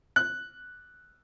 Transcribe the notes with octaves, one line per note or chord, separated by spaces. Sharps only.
F#6